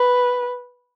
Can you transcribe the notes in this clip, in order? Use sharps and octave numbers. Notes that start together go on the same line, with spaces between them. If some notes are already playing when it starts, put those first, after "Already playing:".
Already playing: B4